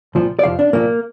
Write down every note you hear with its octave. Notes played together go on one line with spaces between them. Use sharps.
C2 A#2 F3
D5
F2 C3 F3 F5
D4
C2 A#2 F3 A#3